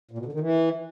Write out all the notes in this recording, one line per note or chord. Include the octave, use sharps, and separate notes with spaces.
A#2
B2
D3
D#3
E3